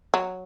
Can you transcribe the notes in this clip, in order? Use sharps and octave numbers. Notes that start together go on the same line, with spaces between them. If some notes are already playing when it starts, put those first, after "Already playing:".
F#3